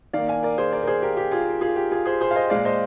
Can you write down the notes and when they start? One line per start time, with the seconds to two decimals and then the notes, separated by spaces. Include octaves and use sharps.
0.13 D#3 A#3 D5 F5
0.28 F5 G#5
0.43 A#4 D5
0.58 G#4 C5
0.72 A#4 D5
0.83 A#4
0.87 G#4 C5
1.02 G4 A#4
1.17 G4
1.32 F4 G#4
1.61 F4 G#4
1.76 G4
1.91 F4 G#4
2.06 G#4 C5
2.21 G#4 C5
2.31 F5
2.35 C5 D#5
2.50 A#2 G#3 D5 F5
2.65 C5 D#5